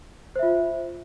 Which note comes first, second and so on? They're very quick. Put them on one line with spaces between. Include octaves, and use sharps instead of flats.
C5 E5 F4